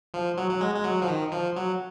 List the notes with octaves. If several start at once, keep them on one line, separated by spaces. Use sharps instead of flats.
F3
F#3
F#3
G#3
G#3
F#3
F3
D#3
F3
F#3